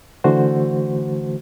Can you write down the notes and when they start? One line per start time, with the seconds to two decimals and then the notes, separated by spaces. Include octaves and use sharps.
0.24 D3 E3 A3 F#4 C5